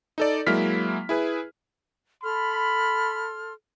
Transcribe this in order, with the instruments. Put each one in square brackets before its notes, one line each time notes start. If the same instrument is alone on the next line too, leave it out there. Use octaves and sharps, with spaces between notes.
[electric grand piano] D#4 A4 D5
F#3 G#3 A#3 E4 F6 B6
E4 G#4 B4
[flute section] A4 C6 F6 [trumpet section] B5